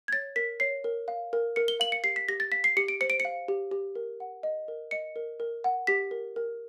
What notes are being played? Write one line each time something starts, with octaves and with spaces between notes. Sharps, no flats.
G#6
C#5 A6
A#4 B6
C#5 C7
A#4
F5
A#4
A#4 C#7
G7
F5 F#7
C#7
G4 C7
B6
G4 A#6
A6
F5 B6
C7
G4 C#7
D7
C5 C#7
D7
C#7
F5
G4
G4
A#4
F#5
D#5
A#4
D#5 C#7
A#4
A#4
F#5
G4 B6
A#4
A#4